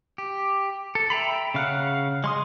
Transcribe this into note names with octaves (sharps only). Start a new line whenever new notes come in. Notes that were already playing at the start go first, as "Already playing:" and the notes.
G4
A4
E5 G5 A#5 B5
C#3 F5 F#5
G#3 C6 D#6